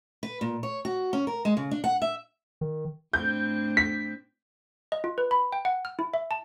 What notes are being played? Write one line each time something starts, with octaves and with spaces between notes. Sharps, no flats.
B4
A#2
C#5
F#4
C#4
A#4
G#3
C#3
D4
F#5
E5
D#3
A2 C4 D4 G6
B6
D#5
F4
B4
B5
G5
F#5
F6
E4
E5
A5